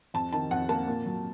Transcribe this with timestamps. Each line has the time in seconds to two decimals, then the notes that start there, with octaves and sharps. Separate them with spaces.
0.14 F2 A5
0.33 D#3 A5
0.51 F2 F#5
0.69 A#3 A5
0.88 A#2
1.06 F#3